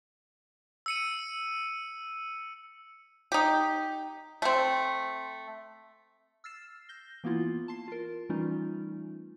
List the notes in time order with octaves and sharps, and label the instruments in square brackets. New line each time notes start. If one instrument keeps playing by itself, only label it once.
[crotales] E6 C#7 D#7
[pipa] D#4 G4
A3 C4
[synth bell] E6 F6 A6 C7 E7
G6 A#6 G7
E3 A#3 B3 E4 F4
A5 C6 C7
F4 A#4
E3 G3 A3 C#4 D#4 F4